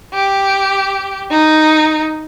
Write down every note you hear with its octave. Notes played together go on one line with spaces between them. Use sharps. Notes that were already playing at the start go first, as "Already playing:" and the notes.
G4
D#4